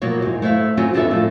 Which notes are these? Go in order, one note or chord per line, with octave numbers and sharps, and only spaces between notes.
B2 F3 F#3 A#3 C#5
E2 G#2
A3 E4 C5 E5 F5
F#3 C4 C#4 F4 F#4
D#2 B3 D4 F4 A4 E5
A2 F3 F4